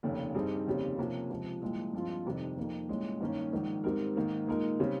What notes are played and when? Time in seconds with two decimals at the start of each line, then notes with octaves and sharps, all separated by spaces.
0.03 F1 D#2 C#3
0.35 G2 G3 C4 D#4 G#4
0.67 F1 D#2 C#3 G3 C4
0.98 C3 F3 A#3 C#4
1.30 C#2 C3 F3
1.62 C2 A#2 F3 G#3
1.93 G2 F3 G#3 C4 F4
2.25 F1 F2 C3 D#3 G3
2.57 F2 D#3 A#3
2.89 C2 A#2 G#3 C#4
3.21 G2 D#3 A#3 C#4
3.52 A#1 G#2 D#3
3.84 G#2 G3 C4 D#4 A#4
4.16 G#2 D#3 A#3
4.47 A#2 G#3 D#4 A#4
4.80 C#3 G3 C4